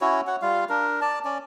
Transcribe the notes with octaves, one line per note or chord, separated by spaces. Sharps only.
C#4 E4 F#4 C#5
F#4 C#5 F#5
G3 F4 F5
D4 A#4
D5 A5
C#4 D5